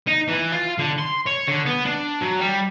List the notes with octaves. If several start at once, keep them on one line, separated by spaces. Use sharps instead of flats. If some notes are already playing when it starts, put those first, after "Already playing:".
D#4
E3
F4
D3
C6
C#5
D3
B3
D4
F#3
G3